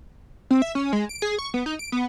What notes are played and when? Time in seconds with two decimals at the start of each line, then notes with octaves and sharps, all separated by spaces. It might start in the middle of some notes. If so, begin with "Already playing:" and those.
0.51 C4
0.62 E5
0.75 C#4
0.93 G#3
1.09 D7
1.22 G#4
1.39 C#6
1.54 B3
1.66 D#4
1.79 D7
1.92 B3